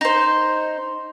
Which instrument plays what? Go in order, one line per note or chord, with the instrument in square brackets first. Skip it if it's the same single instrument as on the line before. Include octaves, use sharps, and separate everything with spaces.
[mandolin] D#4 C5